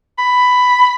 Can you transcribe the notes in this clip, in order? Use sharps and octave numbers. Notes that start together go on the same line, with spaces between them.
B5